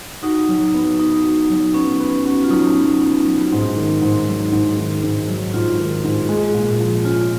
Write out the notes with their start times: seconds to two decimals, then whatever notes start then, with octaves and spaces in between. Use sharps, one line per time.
0.23 D#4 F#4
0.49 F#3
0.74 B3
0.99 D#4 B4
1.24 F#4
1.50 F#3
1.74 B3 C#4
2.00 B4
2.25 C#4 F#4
2.44 F4
2.50 F#3 D#4
2.76 B3
3.01 B4
3.26 F#3
3.52 G#2
3.77 D#3
4.01 G#2
4.27 F#3
4.52 G#2
4.77 D#3
5.03 G#2
5.28 F#3
5.54 G#2 F4
5.79 D#3
6.04 G#2
6.29 G#3
6.54 A#2
6.80 F3
7.05 C#4 F4